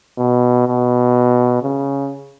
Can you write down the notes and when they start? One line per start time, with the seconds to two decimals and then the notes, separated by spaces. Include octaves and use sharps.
0.18 B2
0.67 B2
1.63 C#3